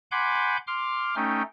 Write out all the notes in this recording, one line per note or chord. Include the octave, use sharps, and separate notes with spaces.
F#5 G#5 B5 C6 D6 G6
C6 D6 F6
A3 C#4 D#4 G5